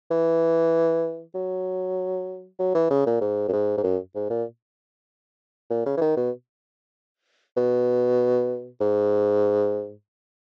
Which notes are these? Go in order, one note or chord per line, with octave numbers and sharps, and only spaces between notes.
E3
F#3
F#3
E3
C#3
A#2
G#2
F#2
G#2
G#2
F#2
G#2
A#2
A#2
C#3
E3
D#3
B2
B2
G#2